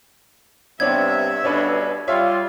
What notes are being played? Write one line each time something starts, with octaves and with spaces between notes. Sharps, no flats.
G2 C3 B3 D4 C#5 E5 G#6
G2 B2 D3 C#4 D4 B4
G3 F4 C#5 E5 F5